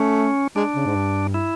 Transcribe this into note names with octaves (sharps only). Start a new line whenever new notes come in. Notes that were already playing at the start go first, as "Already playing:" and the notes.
Already playing: A3 C#4
G#3 D4
C#3
G#2
G2
E4